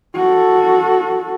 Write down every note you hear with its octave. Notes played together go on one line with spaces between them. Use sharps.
F#4 A4